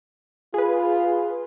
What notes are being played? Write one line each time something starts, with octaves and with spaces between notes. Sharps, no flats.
F4 G#4 B4